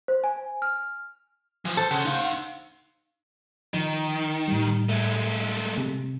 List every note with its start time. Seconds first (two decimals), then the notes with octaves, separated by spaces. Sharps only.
0.08 C5
0.24 G#5
0.62 F6
1.65 E3 F3
1.77 A4 C5
1.91 C#3 C5 F#5
2.05 D#4 F5
3.74 D#3 F3
4.48 A2 G3
4.89 G#3 A3
5.78 C3